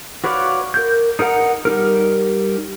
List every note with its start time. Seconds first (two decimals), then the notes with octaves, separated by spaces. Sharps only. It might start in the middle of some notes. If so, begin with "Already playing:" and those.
0.24 F#4 B4 C#5 D5 F5
0.74 A#4 G6
1.19 D#4 A#4 B4 F#5 A#5
1.65 G3 D#4 A#4